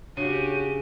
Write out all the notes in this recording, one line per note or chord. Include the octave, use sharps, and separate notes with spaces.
C#3 D4 F#4 G4 D#7